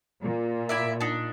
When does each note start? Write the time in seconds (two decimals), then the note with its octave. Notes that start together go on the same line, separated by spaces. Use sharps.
0.22 A#2
0.69 E4 D5 E5
1.01 D4 D#4